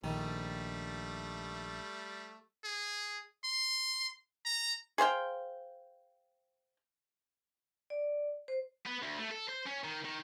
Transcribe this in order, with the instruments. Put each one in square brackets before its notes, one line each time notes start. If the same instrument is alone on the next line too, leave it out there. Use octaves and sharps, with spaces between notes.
[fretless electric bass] A#1 [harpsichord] D#3 [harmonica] G3 A3
[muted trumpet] G#4
C6
A#5
[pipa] G#4 C5 F5 G5
[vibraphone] D5
C5
[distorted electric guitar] B3
D2
A3
A4
C5
C#4
D#3
D#3